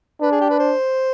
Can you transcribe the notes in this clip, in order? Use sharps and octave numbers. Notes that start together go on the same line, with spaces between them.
D4 B4
G#4
G4
B4
C5